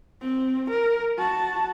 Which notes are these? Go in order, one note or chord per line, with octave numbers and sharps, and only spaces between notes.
C4
A#4
F#4 A5